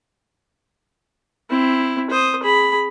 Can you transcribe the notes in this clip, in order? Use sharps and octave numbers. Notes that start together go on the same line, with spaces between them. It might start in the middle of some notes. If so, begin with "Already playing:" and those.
C4 E4
C5 D#6
G#4 B5